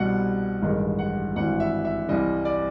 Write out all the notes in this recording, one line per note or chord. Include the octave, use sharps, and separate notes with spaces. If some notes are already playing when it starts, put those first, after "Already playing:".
Already playing: C2 B2 G3 F#5
A1 G2 D#3 G#3
F#5
G#1 G2 E3 G3 F#5
E5
E5
C2 C3 E3 G3 D#5
D5